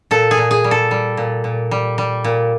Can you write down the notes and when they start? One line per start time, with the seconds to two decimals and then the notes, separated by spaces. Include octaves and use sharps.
0.11 A#2 A4
0.31 G#4
0.38 A#2
0.51 G#4
0.64 G3
0.71 A4
0.91 G3
1.17 A#2
1.44 A#2
1.71 G3
1.98 G3
2.24 A#2